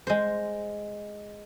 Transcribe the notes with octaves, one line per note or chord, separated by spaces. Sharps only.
G#3 C5